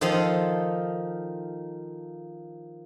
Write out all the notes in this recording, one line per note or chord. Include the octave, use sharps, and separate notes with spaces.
D#3 F3 A4 D#5 C6